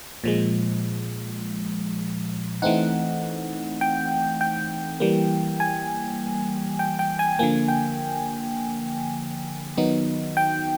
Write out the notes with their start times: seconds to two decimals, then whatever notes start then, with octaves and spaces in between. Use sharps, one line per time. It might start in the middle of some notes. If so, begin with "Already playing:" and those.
0.24 A#2 F3 G#3
2.62 E3 A3 C4 D#4 F#5
3.81 G5
4.41 G5
5.00 E3 G3 A#3
5.60 G#5
6.79 G5
6.99 G5
7.19 G#5
7.39 D3 F3 A#3 G#5
7.68 G5
9.77 D#3 F#3 B3 D#4
10.37 G5